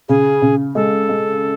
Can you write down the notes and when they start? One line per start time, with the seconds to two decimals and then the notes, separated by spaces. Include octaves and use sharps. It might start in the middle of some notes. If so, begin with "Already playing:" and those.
0.09 C#3 G#4
0.42 C#3
0.75 G#3 A4
1.09 G#3